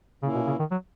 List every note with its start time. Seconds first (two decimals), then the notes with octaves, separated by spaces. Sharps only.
0.23 A#2 C#3 A#3 C#4 E4
0.35 B2
0.47 C#3
0.59 D#3
0.71 F#3